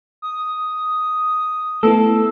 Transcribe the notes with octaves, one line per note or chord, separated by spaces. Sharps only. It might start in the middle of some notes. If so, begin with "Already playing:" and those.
D#6
A3 B3 E4 A4